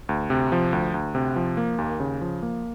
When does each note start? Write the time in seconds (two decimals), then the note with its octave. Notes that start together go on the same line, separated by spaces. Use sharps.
0.09 D2
0.30 C3
0.52 F3
0.73 D2
0.94 D2
1.15 C3
1.36 F3
1.57 A#3
1.78 D#2
2.00 C#3
2.21 F3
2.42 A#3